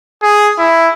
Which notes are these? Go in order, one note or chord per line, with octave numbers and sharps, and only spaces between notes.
G#4
E4